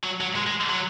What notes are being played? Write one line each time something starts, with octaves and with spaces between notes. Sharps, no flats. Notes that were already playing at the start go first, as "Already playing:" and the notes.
F#3
F#3
G#3
G#3
F#3